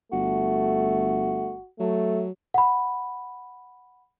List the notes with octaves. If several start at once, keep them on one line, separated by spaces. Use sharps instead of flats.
G1 A3 F#4
F#3 A3
F#5 B5